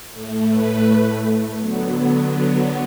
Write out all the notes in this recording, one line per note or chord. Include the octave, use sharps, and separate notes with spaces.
A2 A3
B4
D3 F#3 B3